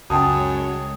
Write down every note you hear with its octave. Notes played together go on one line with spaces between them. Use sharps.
C#2 F#2 G#3 C#5 G5 A5 D#6